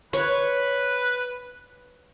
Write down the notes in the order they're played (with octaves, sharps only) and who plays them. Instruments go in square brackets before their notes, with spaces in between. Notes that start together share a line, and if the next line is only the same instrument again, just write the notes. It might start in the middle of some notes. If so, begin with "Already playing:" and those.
[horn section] B4 [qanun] C#5 C#6